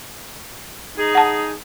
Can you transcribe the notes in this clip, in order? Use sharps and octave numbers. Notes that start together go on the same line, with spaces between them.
D#4 G#4
F#5 A5